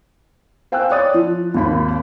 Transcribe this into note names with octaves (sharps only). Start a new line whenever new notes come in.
C5 F5 G5 G#5 E6 F#6
C#5 D5 D#6 F#6 A6
F3
G#1 D#2 B5